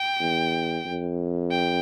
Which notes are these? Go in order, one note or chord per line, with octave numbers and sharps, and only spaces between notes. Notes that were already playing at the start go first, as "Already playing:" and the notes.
Already playing: G5
E2
F2
G5